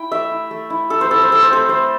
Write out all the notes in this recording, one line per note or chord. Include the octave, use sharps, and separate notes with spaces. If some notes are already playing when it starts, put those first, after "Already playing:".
Already playing: E4 G5
A3 E5
E4
A3
E4
A3 A4
C5
C4 E4 A4
C5
A3 A4
C5
C4 E4 A4
A3 C5